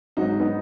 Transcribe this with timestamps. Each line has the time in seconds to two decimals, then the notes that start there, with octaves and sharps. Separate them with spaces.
0.17 G#1 G#2 F#3 D#4 F#4
0.39 B3 D#4